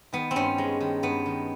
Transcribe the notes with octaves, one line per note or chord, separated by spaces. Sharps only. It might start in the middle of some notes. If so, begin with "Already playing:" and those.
D#3 B3
C4
G2 C#4
G#3
D#3
G2 B3
D#3